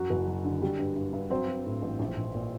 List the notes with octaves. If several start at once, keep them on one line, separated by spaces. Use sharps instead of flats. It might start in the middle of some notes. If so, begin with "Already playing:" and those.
Already playing: F#2 F#3 F#4
F#1
F#3
D3
G3
G2
G2
G2
F#3 C4 C5
F#3
A2
A1
A#1
A#1
A#2